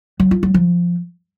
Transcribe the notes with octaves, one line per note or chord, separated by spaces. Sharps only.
F#3
F4
F#3
F3